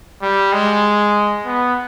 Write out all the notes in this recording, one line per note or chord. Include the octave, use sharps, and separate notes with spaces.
G3
G#3
B3